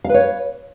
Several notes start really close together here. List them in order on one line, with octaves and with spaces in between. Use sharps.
F5 B4 C#5